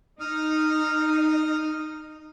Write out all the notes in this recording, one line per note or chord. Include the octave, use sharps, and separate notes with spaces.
D#4 D#6 F6